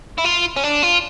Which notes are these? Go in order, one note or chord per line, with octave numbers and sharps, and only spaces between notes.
E4
F4
C#4
D4
F4